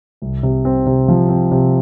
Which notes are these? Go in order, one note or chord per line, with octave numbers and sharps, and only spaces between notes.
C2
C3
C4
C3
F3
C4
C3